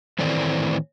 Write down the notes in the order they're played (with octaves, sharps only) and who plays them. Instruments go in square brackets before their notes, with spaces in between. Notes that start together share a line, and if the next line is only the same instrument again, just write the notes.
[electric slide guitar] A2 D#3 E3 A3 C4 D5